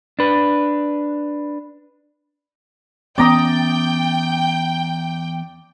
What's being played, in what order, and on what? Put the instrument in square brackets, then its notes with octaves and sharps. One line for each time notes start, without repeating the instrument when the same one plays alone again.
[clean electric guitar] D4 B4
[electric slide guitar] E2 [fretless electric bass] B3 C#4 [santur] D5 A#5 D#6 [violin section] G5